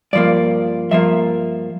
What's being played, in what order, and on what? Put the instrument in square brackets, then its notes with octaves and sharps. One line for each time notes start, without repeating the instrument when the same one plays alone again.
[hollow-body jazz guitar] G2 F3 A#3 D5
G2 F3 A#3 E5